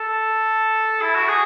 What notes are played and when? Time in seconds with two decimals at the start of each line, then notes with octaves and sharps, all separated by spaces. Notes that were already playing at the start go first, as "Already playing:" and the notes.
Already playing: A4
1.01 E4
1.15 F#4
1.29 G#4